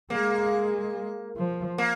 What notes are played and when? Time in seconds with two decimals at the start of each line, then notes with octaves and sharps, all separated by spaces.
0.10 G#3 A#3
1.37 F3
1.78 A#3